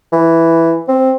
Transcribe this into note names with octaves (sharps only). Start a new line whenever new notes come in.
E3
C4